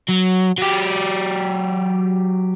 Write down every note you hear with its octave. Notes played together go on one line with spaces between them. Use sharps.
F#3
F#3 G4